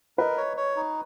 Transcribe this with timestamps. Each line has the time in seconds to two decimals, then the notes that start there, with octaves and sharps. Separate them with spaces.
0.18 A#4 B4 D#5
0.37 C#5
0.57 C#5
0.76 D#4